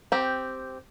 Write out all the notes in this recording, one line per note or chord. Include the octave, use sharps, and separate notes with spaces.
C4 G4